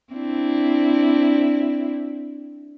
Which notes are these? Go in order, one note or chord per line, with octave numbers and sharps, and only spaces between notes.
C4 D4 E4